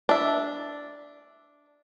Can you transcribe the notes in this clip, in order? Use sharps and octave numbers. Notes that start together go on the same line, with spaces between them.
D4 E5